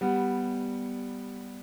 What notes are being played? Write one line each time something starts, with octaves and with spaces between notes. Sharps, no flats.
G3 B3